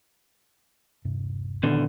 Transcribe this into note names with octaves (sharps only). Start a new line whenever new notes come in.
D#1 G2 C3
E2 A#2 D3 D#3